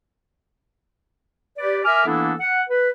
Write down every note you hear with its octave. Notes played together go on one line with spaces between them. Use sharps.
G4 B4 D5
A#4 E5 G#5 D6 F6
E3 A#3 B3 D4 E4 A4
F#5
B4